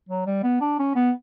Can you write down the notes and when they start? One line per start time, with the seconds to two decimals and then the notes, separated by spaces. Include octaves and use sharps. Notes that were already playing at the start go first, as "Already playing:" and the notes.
0.09 F#3
0.26 G3
0.44 B3
0.61 D4
0.79 C#4
0.95 B3